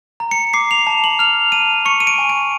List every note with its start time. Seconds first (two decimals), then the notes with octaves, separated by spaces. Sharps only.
0.20 A#5
0.31 C#7
0.54 D6 C7
0.71 F7
0.87 A5
1.04 F#7
1.19 F6 F7
1.52 A5 D#7
1.85 C#6 C#7
2.00 D#7
2.07 D7
2.18 G#5
2.30 D7